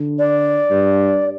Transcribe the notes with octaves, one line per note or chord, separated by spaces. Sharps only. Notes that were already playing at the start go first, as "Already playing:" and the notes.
Already playing: D3
D5
G2